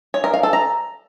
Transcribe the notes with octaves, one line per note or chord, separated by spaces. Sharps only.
C#5
A#4
F5
A4
A#5